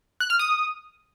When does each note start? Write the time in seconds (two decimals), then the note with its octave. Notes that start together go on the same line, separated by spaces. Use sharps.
0.20 F#6
0.30 F6
0.39 D#6